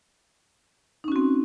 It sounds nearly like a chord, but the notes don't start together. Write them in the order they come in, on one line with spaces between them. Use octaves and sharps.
D#4 C#4 F#4 C4